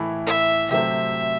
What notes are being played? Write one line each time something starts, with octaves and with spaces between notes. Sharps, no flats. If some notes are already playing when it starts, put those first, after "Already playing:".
Already playing: A2 E3 A3 E4
E5
C3 F#3 A3 C4 E5